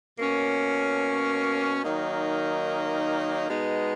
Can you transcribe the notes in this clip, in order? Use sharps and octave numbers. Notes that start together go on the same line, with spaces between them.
B2 A#3 C#4
D#3 F#3 A#3 D#4
B2 G#3 B3 D#4